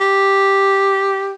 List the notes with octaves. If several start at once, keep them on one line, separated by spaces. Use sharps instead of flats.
G4